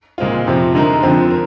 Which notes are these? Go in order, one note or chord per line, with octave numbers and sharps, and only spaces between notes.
A#2 G#3 C4 F4
F2 C3 F3 C4
D3 G#3 D#4 A#4
F2 D3 F3 C4
A#4